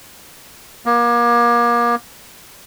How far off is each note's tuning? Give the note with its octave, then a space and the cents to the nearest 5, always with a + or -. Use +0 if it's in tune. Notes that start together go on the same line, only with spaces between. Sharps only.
A#3 +35